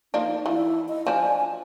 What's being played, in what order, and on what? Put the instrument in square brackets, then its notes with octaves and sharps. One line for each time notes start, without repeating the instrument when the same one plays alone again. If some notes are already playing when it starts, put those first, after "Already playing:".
[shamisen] F3 A#3 D4 [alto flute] D#4
[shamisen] E3 F3 [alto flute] E4
[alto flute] D#5
[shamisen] F3 D4 [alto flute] G#5